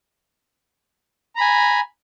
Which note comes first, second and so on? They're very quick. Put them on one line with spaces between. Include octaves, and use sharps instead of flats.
A#5 B5 G#5